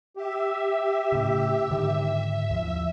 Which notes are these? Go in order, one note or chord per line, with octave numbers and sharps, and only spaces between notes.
G4 E5
A2 C#3
G#2 D3 D#3
D#2 F3